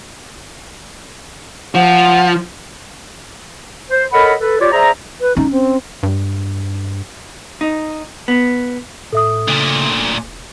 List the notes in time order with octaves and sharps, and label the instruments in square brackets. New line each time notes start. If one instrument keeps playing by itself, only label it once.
[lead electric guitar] F3 [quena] F#5
[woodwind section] C5
A4 A#4 C#5 D#5 F#5 B5
A4 B4
F4 G4 C#5 D5
G#4 C5 D5 E5 A#5
[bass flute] B4
[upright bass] C#4 [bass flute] D#4
[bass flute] C4
[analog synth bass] G2
[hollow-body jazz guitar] D#4
B3
[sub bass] A2 [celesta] A4 E5 D#6
[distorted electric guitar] D2 A#2 [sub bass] C#3
[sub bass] E1